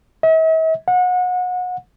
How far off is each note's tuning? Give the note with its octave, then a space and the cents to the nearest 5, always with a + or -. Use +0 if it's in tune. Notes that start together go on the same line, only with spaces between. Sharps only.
E5 -45
F#5 -30